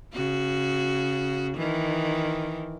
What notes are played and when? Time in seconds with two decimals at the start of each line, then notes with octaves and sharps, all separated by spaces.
0.13 C#3 F#4
1.58 D#3 E3